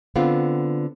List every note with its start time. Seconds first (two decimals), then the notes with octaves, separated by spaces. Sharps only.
0.16 D3 B3 C4 F4